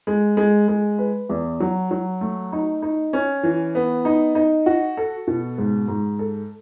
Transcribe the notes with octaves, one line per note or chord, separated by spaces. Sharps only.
G#3
G#3
G#3
B4
E2
F#3
F#3
A3
D#4
D#4
C#4
E3
B3
D#4
D#4
F#4
A4
B2
G#2
G#2
A4